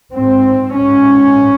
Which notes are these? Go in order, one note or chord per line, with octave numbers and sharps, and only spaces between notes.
G#2 C4
G#2 C#4